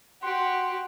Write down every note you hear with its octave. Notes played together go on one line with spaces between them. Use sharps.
F#4 G4 F#5 C6